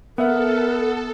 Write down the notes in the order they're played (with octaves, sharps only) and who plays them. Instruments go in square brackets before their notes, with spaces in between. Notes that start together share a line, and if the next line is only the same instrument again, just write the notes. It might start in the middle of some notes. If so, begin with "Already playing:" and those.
[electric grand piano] B3 E5 F#5 [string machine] A4 [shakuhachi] A#4